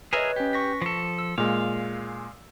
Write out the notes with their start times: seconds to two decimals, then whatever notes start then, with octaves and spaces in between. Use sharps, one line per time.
0.13 G#4 A#4 B4 C#5 D#5 E5
0.36 C#4 G4 B4
0.53 C#6 A#6 B6
0.82 F3 A4
1.19 E6
1.38 A#2 G#3 F5